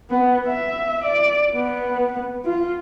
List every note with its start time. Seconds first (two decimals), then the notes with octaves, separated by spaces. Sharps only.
0.10 B3
0.47 E5
1.04 D5
1.55 B3
2.45 F4